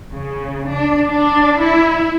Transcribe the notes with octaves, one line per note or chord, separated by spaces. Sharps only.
C#3
D4
D4
E4